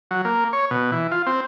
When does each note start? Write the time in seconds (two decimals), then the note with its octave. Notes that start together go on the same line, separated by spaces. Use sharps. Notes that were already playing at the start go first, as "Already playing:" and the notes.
0.11 F#3
0.25 A#3
0.53 C#5
0.71 B2
0.92 E3
1.11 F4
1.27 C4